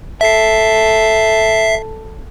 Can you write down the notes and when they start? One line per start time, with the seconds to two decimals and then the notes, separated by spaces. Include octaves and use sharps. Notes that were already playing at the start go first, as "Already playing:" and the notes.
0.21 A4 E5 C7